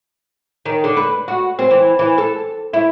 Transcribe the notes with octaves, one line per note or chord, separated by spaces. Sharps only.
D#3
D3
B4
F#4
C4
E3
E3
A4
E4